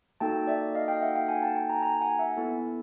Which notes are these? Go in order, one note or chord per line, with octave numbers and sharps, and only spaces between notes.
A#3 D#4 F#4 A4 G5 A5
D5 E5
D#5 F5
F5 G5
E5 F#5
F5 G5
F#5 G#5
G5 A5
G5 A5
G#5 A#5
G#5 A#5
F#5 G#5
E5 F#5
B3 E4 A4